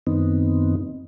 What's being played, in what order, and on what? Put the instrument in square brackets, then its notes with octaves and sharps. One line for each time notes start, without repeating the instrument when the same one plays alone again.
[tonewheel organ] F#2 D#3 B3 C4 D#4